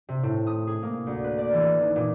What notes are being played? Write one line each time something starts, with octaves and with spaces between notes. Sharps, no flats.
C3
A2
D#6
G#4
A#3
D2
B4
D5
E3
D#4
A#2